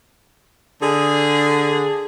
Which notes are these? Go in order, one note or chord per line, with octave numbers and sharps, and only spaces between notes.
D3 G#4